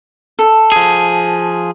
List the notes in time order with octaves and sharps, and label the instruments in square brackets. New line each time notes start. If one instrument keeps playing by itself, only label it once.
[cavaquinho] A4
[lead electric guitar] F3 G#4